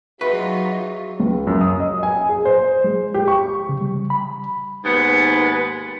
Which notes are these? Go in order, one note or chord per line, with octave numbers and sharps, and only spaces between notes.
F#3 D#4 F4 F#4 G#4 B4 E5 C#6
C#2
F#2
D#6
D#5
G#5
G#4
C5
G#3
G4
C#6
C#3
G3
B5
D#2 G#2 B3